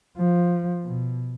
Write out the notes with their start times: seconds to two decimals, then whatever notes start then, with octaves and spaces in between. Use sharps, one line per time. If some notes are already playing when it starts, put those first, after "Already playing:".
0.17 F3
0.84 B2